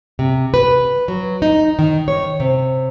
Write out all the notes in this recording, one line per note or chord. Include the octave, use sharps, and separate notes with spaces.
C3
B4
F#3
D#4
D#3
C#5
C3